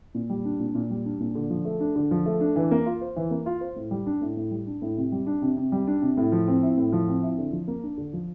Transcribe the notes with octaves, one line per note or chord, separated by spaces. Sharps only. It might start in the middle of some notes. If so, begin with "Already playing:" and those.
A#2
G3
D4
A#2
A#2
G3
D4
A#2
D3
F3
A3
D4
D3
F3
A3
D4
E3
A#3
F4
C5
E3
A#3
F4
C5
A2
G3
D4
A2
A2
G3
D4
A2
C3
G3
D4
C3
C3
G3
D4
C3
A2
F3
C4
E4
A2
F3
C4
E4
D3
F3
A#3
D4
D3
F3